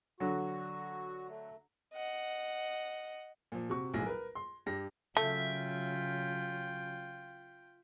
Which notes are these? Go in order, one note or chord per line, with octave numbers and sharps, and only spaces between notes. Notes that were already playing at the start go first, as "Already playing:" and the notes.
D3 F#3 F#4
A3
D#5 F#5
A#2 F3
C3 F#4 C#6
D#1 B1 A2 G#4 A#6
A#4 B4
C6
G2 G4 A#6
C#3 F#3 A3 F4 E5 G5